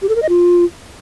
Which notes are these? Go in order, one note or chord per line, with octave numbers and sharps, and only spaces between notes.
G4
A4
A#4
D#5
F4